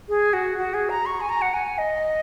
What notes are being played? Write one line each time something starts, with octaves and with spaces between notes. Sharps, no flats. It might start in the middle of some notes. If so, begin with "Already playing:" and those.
G#4
F#4
F#4
G#4
A#5
C#6
G#5
A#5
F#5
G#5
D#5